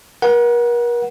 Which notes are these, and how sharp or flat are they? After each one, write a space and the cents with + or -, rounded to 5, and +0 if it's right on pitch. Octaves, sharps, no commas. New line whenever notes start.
A#4 +40 F#5 +0